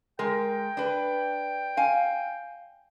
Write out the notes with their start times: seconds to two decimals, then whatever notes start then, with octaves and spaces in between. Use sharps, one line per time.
0.19 G#3 A#4 G5
0.77 D4 B4
1.77 F5 G#5